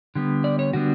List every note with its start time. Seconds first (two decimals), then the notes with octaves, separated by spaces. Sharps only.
0.15 D3 G3 B3
0.44 D5
0.59 C#5
0.73 D3 G3 B3 D4 F#4